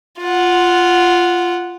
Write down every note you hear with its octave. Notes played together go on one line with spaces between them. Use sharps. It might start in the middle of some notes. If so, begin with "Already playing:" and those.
F4 F#5